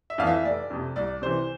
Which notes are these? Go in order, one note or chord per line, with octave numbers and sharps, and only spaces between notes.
E5
F2 E3 F5
E5
F1 D5
F2 C3
C2 D5
C3 E3 C5